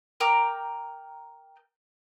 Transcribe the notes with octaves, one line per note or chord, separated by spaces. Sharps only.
A#4 G5 A#5 D6